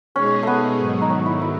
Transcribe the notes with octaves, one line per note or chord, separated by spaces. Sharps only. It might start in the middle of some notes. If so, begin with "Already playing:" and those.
B2 G#3 C#4 D#4 G#4
A3 B3
G#2 D#3 F#3
D#4
C#4
E4
E4